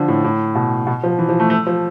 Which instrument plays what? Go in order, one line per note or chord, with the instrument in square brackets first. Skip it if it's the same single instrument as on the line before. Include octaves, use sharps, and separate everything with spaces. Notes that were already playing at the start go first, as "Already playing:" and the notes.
Already playing: [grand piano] D3 F3
A2
A2
B2
B2
F3
E3
F3
A3
A3
F3